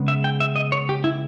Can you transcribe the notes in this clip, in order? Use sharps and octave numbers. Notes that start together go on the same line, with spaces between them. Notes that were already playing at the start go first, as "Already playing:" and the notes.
Already playing: C#3 G#3 B3
E5
G5
E5
D#5
C#5
G4
E4